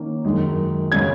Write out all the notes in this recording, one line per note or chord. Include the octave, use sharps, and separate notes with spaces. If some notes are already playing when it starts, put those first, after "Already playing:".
Already playing: D#3 A#3 C#4
F#2 D#3 G#3
C#3 G#3 C#4 G#6